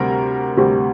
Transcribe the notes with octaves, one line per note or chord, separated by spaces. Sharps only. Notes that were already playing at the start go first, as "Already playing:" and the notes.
Already playing: D2 C3 G3 A#4
D2 C3 G3